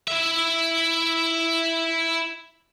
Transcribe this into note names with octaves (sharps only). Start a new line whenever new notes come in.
E4 E5